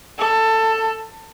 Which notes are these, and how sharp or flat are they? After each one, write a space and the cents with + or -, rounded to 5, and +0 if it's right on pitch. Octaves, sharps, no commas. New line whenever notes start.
A4 +15